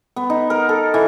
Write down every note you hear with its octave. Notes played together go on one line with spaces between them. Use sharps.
B3
D#4
A#4
A4
E3